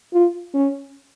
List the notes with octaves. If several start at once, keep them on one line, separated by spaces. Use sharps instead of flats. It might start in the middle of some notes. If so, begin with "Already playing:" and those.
F4
C#4